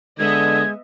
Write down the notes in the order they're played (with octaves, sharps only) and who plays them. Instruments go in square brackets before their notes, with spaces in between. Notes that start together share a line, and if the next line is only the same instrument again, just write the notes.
[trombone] D3 [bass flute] G#3 [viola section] B3 D#5 E5 [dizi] G#6